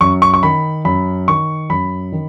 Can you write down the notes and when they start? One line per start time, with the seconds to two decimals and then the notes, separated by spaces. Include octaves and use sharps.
0.01 F#2 C#6
0.22 C#6
0.34 C#6
0.43 D#3 B5
0.85 F#2 B5
1.28 D#3 C#6
1.70 F#2 B5
2.12 D#3